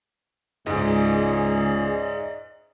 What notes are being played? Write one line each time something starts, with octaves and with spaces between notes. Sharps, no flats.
C#2 G#2 G#4 D5 D#5